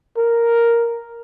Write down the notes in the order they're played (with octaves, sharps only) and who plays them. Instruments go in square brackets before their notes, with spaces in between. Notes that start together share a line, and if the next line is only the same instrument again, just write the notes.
[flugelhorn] A#4